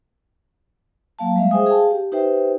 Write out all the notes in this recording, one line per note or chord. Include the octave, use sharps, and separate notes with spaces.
F#3 A#3 F5 A5
G3 G#3 E5 F5
G#4 C5 E5 G5 G#5 D#6
G#4 F5 G5 A5
G4
D#4 G4 B4 C5 E5 G5